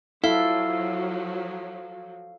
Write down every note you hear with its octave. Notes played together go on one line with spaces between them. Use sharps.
F3 F#3 E4 A4 F5